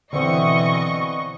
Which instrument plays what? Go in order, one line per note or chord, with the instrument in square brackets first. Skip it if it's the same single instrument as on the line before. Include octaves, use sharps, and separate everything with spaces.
[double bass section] B2 E3 [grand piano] D3 C4 [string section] D#5 C#6